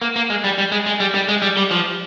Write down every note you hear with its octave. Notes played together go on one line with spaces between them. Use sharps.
A#3
A#3
G#3
G3
G3
G#3
G#3
G3
G3
G#3
G3
G3
F3